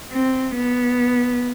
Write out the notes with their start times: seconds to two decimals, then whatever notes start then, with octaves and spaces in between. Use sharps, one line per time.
0.12 C4
0.56 B3